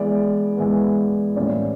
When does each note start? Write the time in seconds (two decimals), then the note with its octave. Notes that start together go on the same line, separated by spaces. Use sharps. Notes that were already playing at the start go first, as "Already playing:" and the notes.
Already playing: E3 G#3 B3 D5
0.56 E3 G#3 B3
1.36 A2 E3 G3 A#3 C#4 D5